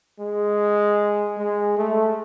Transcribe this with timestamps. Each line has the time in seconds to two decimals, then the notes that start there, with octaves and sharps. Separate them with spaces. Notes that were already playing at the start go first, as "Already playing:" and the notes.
0.20 G#3
1.37 G#3
1.77 A3